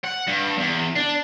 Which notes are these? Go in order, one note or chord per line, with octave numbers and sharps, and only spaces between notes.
F#5
G2
E2
D4